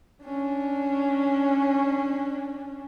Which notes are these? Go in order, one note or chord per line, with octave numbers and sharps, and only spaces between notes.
C#4 D4